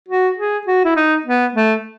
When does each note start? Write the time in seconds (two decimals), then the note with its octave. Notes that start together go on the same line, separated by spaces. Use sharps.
0.08 F#4
0.38 G#4
0.67 F#4
0.85 E4
0.96 D#4
1.26 B3
1.55 A3